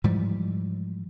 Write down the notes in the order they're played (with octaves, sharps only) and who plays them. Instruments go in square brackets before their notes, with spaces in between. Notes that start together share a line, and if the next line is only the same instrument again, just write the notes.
[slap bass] G#2 E3 F3 G3